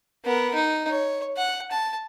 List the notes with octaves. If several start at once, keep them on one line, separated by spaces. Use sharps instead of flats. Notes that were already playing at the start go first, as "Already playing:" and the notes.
B3 A#4
D#4
C#5
F#5
A5